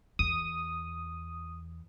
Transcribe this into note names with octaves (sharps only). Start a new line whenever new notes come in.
E2 D#6